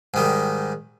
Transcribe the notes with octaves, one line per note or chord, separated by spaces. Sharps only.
G#2 D#3 G3